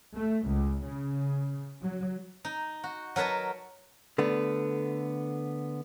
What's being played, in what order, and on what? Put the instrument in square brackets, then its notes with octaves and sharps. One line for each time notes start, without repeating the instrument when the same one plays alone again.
[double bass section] A3
C#2
C#3
F#3
[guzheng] D#4
F#4
F#3 A#4 B4 D#5 A5
[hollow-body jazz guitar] D3 A3 B3